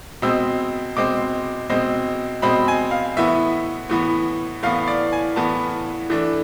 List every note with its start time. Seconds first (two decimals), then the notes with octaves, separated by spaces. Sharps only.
0.22 B2 G#3 C4 E6
0.97 B2 G#3 C4 D6
1.69 B2 G#3 C4
2.42 B2 G#3 C4 B5
2.68 G#5
2.91 F5
3.17 A2 E3 B3 E5
3.89 A2 E3 B3
4.63 A2 E3 B3 F5
4.88 D5
5.12 G#5
5.36 A2 E3 B3 A5
6.10 E3 A3 D4